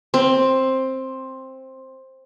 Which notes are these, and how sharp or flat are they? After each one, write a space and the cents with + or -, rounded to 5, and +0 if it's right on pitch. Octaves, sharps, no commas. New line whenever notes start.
C4 +10